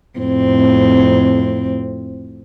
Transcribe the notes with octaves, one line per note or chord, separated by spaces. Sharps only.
F2 A2 C4